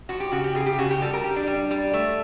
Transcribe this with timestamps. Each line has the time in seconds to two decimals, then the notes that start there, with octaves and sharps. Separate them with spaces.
0.09 F3 F#4
0.20 G4
0.32 C#3 F#4
0.44 G4
0.55 C#3 G#4
0.66 G4
0.78 C#3 F#4
0.91 G4
1.02 G3 A4
1.13 A#4
1.24 G3 G4
1.36 D4
1.47 G3
1.71 G3
1.93 A3